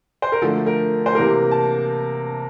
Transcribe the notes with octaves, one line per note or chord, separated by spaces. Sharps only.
C5
A#4
D3 F3 A3 A4
A#4
C5
C3 E3 A#3 A#4
A5